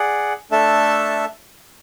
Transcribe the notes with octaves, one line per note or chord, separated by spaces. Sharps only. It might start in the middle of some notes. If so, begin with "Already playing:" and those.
Already playing: G#4 D5 F#5
A3 D4 A4 E5 A5